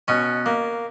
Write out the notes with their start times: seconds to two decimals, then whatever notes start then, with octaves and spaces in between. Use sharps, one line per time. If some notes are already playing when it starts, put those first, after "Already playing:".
0.08 B2 C#4
0.46 A#3